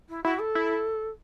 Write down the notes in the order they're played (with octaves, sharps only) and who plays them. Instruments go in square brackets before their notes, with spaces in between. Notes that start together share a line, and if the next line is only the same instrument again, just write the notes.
[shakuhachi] E4
[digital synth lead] E4 [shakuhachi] F#4
[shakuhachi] A4
[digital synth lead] E4